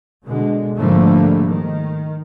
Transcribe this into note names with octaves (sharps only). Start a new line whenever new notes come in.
B2 D3 G#3
G#2 D3 F3 G3 A3 A#3
D#3